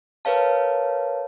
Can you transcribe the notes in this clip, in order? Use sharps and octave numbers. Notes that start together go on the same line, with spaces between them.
A#4 B4 C#5 F5 A5